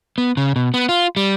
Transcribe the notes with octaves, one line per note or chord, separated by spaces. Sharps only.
B3
C#3
B2
B3
F4
G3